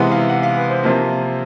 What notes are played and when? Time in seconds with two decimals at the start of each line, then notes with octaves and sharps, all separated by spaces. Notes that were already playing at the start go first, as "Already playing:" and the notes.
Already playing: C3 E3 G#3 B3 F#5
0.12 F5
0.30 F#5
0.43 F5
0.57 B4
0.70 C5
0.83 C3 F3 A#3